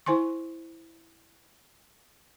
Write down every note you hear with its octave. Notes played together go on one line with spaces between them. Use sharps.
E4 C5 G#5 C6 C#6